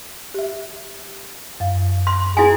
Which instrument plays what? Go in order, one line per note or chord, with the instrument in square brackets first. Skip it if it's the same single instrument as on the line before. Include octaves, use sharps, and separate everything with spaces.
[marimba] G4 E5
F#2 F5
[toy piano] C6
[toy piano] E4 F#4 G#5 [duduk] G#4